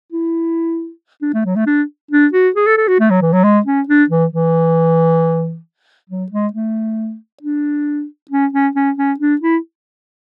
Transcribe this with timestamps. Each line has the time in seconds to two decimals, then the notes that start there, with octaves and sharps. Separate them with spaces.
0.12 E4
1.22 D4
1.34 A3
1.45 F#3
1.56 A3
1.67 D4
2.11 D4
2.33 F#4
2.56 G#4
2.67 A4
2.77 A4
2.88 F#4
3.00 A3
3.10 F#3
3.22 E3
3.33 F#3
3.44 G#3
3.66 C#4
3.88 D4
4.10 E3
4.33 E3
6.10 F#3
6.32 G#3
6.53 A3
7.43 D4
8.31 C#4
8.53 C#4
8.75 C#4
8.97 C#4
9.20 D4
9.41 E4